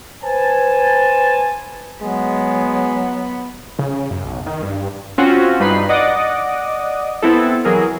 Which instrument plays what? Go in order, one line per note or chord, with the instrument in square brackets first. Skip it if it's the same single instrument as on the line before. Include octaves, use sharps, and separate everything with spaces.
[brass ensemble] B4 C5 G#5 A5
[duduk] F#3 [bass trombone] G#3 [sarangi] B3
[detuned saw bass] C#3
F#2
B1
D#3
G2
[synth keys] C4 C#4 F4 F#4
G2 D#4 B4 B5 C7
D5 D#5 F#5 D6 D#6
B3 C4 E4 A4
E3 F#3 G#4 A#4